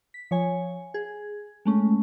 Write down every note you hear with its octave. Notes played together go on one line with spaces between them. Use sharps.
B6
F3 C#5 G#5
G#4
G#3 A3 C#4